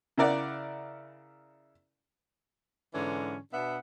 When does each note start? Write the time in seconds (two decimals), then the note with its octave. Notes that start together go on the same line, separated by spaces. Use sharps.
0.18 C#3 E4 A#4 D5 F#5
2.93 G#2 D3 E3 C#4
3.52 B2 B3 D4 E5 F#5